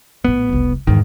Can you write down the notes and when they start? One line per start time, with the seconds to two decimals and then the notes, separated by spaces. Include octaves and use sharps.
0.24 A#1 A2 B3
0.49 F1 C2
0.87 E2 G#2 D3 D#3